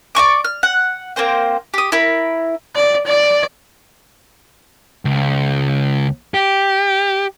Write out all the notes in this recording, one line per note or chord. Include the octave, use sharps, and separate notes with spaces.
D5 D#5 C#6 D6
F6
F#5
A#3 C4 C5 G5
G4 D#6
E4 A#4 B5
D5
D5
C#2
G4